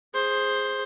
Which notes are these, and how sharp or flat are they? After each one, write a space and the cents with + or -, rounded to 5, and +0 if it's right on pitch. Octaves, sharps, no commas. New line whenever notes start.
G#4 +0 C5 +10